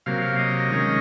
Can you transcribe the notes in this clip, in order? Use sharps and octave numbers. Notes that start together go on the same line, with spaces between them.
C3 F#3 A#3 F5
F5
D#5
D#3 G#3 C#4